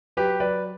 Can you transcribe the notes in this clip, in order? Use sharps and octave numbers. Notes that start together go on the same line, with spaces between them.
F#3 G4 B4
F#3 B4 D5